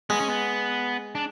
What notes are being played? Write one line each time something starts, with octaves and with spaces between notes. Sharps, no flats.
G#3 B3
C#4
B3
D4